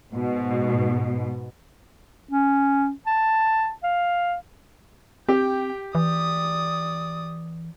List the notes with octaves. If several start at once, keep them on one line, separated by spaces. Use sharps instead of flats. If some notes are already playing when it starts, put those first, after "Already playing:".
G#2 B2
C#4
A5
F5
C4 G4 G5
E3 D5 D#6